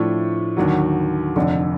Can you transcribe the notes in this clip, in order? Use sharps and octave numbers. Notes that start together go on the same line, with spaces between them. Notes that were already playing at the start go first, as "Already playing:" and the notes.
Already playing: A2 F3 A3 D4
D#2 D3 F#3
F1 F2 D3